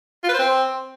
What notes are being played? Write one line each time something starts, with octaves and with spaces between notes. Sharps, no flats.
F4
B4
C5
C4